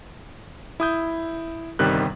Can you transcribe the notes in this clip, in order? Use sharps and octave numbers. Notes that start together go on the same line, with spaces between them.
E4 D#6 G6
G1 C3 D#3 G3 F#6